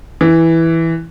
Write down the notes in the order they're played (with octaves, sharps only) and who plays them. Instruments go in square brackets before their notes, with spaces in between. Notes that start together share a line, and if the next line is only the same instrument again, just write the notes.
[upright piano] E3